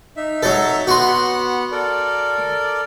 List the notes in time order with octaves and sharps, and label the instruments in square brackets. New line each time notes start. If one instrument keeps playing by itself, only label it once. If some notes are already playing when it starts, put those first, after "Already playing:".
[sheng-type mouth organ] D#4 E5
[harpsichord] F#3 A4
[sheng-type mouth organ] B3 F#5 [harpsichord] F#4 C6
[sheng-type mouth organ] A4 A#4 D5